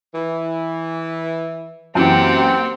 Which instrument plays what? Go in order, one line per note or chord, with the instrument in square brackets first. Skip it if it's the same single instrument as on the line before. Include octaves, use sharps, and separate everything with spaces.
[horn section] E3
[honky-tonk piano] F#2 E3 [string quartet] A#3 G4 F#5 [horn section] C4